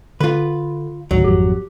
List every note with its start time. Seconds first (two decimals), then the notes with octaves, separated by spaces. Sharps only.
0.20 D3 F4 B4
1.11 D2 A2 D#3 F#3
1.24 G#1 F2 G4